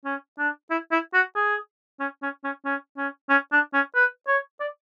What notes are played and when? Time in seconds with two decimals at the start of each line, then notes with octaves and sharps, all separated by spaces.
0.05 C#4
0.38 D4
0.70 E4
0.91 E4
1.14 F#4
1.36 G#4
2.00 C#4
2.22 C#4
2.44 C#4
2.65 C#4
2.97 C#4
3.30 C#4
3.52 D4
3.74 C#4
3.95 B4
4.28 C#5
4.60 D5